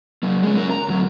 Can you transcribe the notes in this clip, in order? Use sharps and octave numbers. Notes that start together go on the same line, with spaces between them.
F#3 A#3
G#3 C#4
C#4 A#4
A#5
D2 F#3